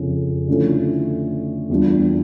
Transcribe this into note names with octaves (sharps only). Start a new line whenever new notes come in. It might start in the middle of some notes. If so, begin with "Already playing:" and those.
Already playing: F2 C#3 F3 C#4
D3 F3 A3 C#4 E4
E2 E3 G3 D4 F4